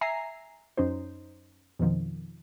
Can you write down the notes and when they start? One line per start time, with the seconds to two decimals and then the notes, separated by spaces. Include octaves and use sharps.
0.01 E5 G#5 A#5 C7
0.77 F#2 C#4 D#4 C5
1.79 F2 B2 D#3 F3